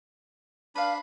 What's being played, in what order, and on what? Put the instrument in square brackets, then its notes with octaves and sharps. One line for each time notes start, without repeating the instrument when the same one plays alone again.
[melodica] D4 B5 [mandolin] B4 F5